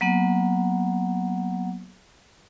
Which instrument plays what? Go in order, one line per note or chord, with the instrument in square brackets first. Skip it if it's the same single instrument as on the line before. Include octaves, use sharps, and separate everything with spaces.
[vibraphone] F#3 A#3 B3 F#5